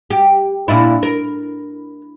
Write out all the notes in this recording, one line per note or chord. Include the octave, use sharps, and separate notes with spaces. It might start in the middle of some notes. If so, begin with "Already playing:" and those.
G4
A#2 D4 E4
A#4